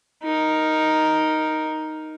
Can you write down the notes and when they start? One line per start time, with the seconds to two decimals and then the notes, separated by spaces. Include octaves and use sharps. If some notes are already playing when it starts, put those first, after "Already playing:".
0.23 D#4 A#4